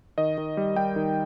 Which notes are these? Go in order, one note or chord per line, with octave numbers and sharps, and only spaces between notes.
D#3 D#5
D#3
G3
G3 G5
D#3